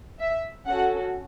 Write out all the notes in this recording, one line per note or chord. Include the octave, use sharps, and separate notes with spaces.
E5
C#4 F#4 A4 F#5